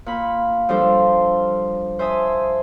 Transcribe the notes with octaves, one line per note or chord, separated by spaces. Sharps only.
A#2 B5
F3 G3 D4 A4 C5
C5 E5 G#5 A5 D#6